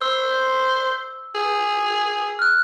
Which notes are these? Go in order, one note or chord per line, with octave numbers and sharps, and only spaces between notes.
C5 E6
G#4
F6 F#6